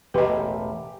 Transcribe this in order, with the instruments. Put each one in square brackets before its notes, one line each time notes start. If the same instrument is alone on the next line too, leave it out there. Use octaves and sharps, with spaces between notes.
[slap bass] E1 A1 [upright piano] G4 [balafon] B4 D#5